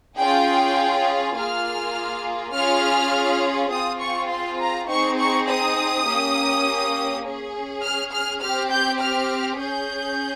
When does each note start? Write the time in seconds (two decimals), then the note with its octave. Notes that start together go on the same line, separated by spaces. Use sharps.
0.18 C#4 F4 G#4 G5
1.36 A#3 F4 G#4 F6
2.54 C#4 F4 G#4 F6
3.71 C4 F4 G#4 D#6
4.01 C#6
4.30 C6
4.60 A#5
4.89 C4 D#4 G#4 C#6
5.19 C#6
5.48 D#6
6.07 A#3 C#4 G4
7.24 C#4 G#4
7.82 F6
8.12 F6
8.41 C4 G4 F6
8.71 G6
9.01 F6
9.59 C#4 G#4 G6